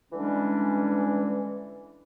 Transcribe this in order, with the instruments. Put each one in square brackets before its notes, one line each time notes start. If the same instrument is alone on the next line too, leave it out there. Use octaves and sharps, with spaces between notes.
[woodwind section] D3 E3 G3 G#3 C#4 D4